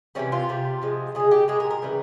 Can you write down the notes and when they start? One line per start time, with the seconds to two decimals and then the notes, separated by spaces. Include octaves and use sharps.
0.15 C3 E3 G3 C#4
0.32 F4
0.49 C3 G3
0.82 C3 F3 G#3
1.15 C#3 F3 G#3 G#4
1.31 G4
1.48 A#2 G#3 G#4
1.60 A#4
1.71 A#4
1.82 C#3 E3 G3